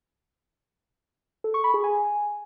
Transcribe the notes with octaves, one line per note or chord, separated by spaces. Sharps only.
A4
C#6
B5
G#4
G#5